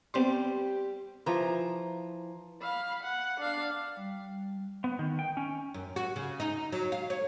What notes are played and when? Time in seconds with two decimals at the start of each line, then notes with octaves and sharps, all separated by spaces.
0.14 G3 B3 C4 G4 C6
1.26 E3 F3 A#5
2.63 F5 B5
3.03 F#5
3.40 D4 F5
3.97 G3
4.84 B3
4.99 D#3
5.19 G5
5.37 C#4
5.74 F#2
5.96 F#4
6.16 C#3
6.40 D#4
6.72 F#3
6.92 F5
7.10 C#5